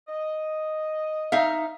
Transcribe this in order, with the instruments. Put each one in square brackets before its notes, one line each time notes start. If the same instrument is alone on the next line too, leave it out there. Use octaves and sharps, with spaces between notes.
[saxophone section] D#5
[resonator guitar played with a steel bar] D#4 E5 F5